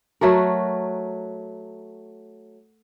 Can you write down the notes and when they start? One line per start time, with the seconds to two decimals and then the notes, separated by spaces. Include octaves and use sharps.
0.21 F#3 A3 F#4 A#4